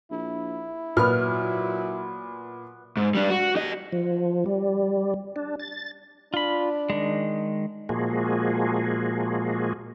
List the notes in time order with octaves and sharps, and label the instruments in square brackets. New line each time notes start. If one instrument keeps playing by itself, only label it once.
[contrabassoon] A#1 [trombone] E4
[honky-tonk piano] A#2 F6 [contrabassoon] F#3 [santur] B3 B4
[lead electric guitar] G#2
G3 D4
F#4
G4 D#5
[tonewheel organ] F3
G3
D4
A6
[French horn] D4 [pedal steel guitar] F4 B5
[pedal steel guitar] D#3 G#3
[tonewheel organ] A#2 F3 G#3 A#3 F#4 G#4